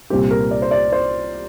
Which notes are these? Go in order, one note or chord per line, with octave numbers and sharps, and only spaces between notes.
C2 A#2 G3 C4 G4
A#4
D5
C5
D5
C5